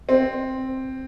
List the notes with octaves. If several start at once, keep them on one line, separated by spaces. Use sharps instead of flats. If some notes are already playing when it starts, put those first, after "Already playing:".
C4